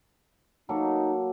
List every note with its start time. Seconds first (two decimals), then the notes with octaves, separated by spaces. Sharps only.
0.69 F#3 A#3 D#4 A4